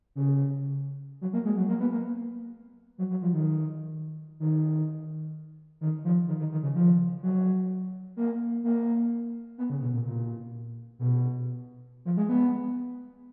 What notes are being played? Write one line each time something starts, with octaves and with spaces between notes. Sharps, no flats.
C#3
F#3
A#3
G#3
F#3
A#3
B3
A#3
F#3
F#3
F3
D#3
D#3
D#3
F3
D#3
D#3
D#3
C#3
F3
F#3
A#3
A#3
B3
C#3
B2
A#2
A#2
B2
F3
G#3
B3